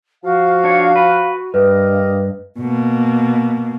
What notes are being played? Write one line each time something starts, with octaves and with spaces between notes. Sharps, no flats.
F3 F#4 F5
D4 C#5
B4
G2 G4 A#4 B4 D#5
B2 A#3